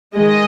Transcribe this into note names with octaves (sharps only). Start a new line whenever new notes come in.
D#3 G#3 D#5